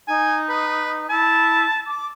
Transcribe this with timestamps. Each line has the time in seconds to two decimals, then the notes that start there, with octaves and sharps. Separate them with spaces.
0.08 D#4 G#5
0.49 B4
1.10 E4 A5
1.87 D6